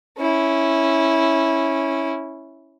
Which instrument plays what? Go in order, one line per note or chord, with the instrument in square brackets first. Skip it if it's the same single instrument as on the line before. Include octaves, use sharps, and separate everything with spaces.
[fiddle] C#4 E4